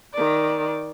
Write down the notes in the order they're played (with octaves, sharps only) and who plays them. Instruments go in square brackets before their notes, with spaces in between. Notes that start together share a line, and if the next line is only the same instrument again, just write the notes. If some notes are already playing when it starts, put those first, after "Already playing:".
[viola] D#3 D5